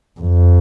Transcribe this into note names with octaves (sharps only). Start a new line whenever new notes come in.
F2